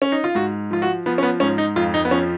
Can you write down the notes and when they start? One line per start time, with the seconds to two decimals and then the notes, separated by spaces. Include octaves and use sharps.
0.02 C#4
0.12 D#4
0.24 F4
0.35 G#2 F#4
0.71 F3 F4
0.82 F#4
1.06 F3 B3
1.18 C#4
1.23 B3
1.40 G#2 C#4
1.58 D#4
1.76 F2 F4
1.94 D#4
2.05 B3
2.11 F3 C#4